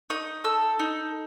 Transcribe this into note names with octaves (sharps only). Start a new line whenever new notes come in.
D#4 D#6
A4 E6
D#4